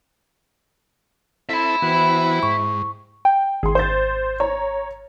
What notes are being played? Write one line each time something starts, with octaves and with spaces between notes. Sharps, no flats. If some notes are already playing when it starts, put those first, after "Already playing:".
C4 E4 A4 E5 B5
E3 B3 C4 E4 F#4
G#2 C#6
G5
G#1 G#4 C6
C5 A6
C#5 A#5